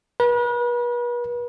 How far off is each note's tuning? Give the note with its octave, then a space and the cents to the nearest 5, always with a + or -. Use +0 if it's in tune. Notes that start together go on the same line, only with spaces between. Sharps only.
B4 -40